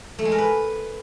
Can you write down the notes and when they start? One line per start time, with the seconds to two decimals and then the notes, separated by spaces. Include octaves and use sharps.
0.19 A3
0.25 G#3
0.32 A#4
0.38 B4